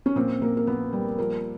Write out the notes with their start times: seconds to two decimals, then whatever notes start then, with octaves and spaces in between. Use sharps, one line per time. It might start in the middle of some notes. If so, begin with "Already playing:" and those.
0.06 C#4
0.16 A#2 C4
0.42 A#2 A#3
0.57 A#3
0.67 A#2 B3
0.93 G3
1.18 F3 A#3